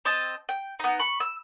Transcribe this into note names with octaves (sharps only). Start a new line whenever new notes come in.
C4 D#5 A5
G5
B3 D#4
B5 C#6
E6